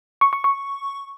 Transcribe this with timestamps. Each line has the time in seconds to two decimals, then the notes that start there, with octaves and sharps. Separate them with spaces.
0.21 C#6
0.33 C#6
0.44 C#6